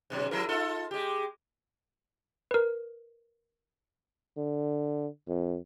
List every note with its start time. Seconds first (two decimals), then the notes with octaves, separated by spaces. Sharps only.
0.10 G#2 B2 F#3
0.31 F3 E4 A#4
0.49 D#4 F4 A4
0.91 G#3 G4
2.51 A#4 B4
4.37 D3
5.28 F2